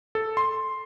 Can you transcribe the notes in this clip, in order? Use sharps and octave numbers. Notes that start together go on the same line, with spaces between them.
A4
C6